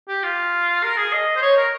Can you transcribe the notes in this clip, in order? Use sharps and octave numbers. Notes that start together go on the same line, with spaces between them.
G4
F4
A#4
G#4
D#5
C5
C#5
A#4